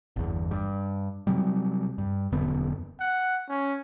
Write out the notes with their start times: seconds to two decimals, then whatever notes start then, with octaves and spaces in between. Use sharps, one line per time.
0.16 G1 E2
0.51 G2
1.27 C3 F#3 G3
1.98 G2
2.32 E1 F#2 D3 B3
3.00 F#5
3.49 C#4